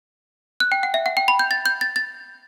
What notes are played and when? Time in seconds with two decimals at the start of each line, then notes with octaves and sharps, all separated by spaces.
0.60 F#6
0.72 G5
0.83 F#5
0.94 E5
1.06 F#5
1.17 G5
1.28 B5
1.39 G6
1.51 A6
1.66 G6
1.81 A6
1.96 A6